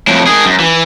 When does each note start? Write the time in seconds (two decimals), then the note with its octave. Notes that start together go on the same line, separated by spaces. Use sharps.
0.07 F2 A2
0.26 D#3 G#4
0.46 F#2
0.60 E3